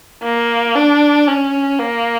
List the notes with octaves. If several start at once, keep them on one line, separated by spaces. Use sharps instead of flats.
A#3
D4
C#4
A#3